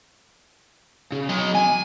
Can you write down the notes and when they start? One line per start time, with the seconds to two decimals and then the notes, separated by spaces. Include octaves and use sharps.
1.12 C#3
1.29 F#3 D#5
1.55 G#5